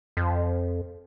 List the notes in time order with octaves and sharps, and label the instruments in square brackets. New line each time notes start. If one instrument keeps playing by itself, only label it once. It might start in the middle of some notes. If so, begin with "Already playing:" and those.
[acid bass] F2